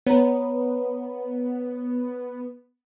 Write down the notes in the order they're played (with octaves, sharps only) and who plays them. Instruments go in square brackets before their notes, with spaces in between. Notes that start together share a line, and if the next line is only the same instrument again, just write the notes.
[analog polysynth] B3 [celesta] C#5 A#5